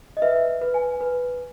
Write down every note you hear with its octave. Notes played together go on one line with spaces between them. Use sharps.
D#5
B4 E5
B4
G#5
B4